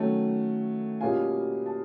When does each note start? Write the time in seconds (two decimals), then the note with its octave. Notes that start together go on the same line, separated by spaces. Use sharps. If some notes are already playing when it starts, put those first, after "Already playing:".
Already playing: D#3 F#3 A3 C#4
1.01 B2 G3 A#3 C#4 F4 G#5
1.66 A5